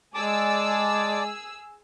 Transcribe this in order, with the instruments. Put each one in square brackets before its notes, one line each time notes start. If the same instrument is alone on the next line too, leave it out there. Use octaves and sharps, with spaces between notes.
[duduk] G#3 [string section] G#4 E6 [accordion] D5 A5 D6